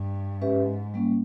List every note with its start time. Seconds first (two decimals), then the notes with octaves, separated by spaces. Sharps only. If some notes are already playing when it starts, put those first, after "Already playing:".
Already playing: G2
0.41 G#2 C#4 G4 B4 E5
0.94 G3 A#3 C#4